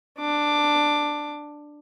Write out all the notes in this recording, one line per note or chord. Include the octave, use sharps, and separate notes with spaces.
D4 D6